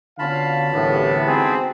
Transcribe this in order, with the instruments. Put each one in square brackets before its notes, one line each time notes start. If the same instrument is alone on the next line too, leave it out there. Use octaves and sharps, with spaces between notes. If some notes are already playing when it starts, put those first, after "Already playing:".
[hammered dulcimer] B2 C#4 F4 [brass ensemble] D3 F5 [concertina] A5 B5
[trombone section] C2 A2 [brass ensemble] D3 E3 B3 [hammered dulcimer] G4
[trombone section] G#2 C4 G#4 [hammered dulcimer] F#4 B4